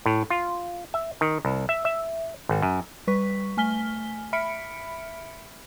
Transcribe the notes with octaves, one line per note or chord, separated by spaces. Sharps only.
A2
F4
E5
D#3
C2
E5
E5
G#1
F#2
G3 B4 C#6 B6
A3 G#5 F6 B6 G7
E5 B5 F6 B6 C#7 D7